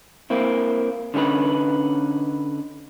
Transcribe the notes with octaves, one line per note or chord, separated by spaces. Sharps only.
A#3 C4 E4
D3 C#4 D#4 G#4 B4